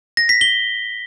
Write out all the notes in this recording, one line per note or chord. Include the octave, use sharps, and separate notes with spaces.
A#6
B6
G7